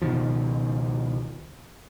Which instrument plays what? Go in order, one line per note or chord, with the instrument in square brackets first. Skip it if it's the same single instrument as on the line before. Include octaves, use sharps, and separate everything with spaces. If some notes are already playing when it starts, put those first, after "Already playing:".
[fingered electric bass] C#2 B2 D#3 F3